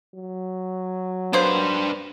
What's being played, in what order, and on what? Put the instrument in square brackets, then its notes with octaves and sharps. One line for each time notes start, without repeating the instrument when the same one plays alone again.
[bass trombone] F#3
[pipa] A#3 B3 C5 [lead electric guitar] D4 B4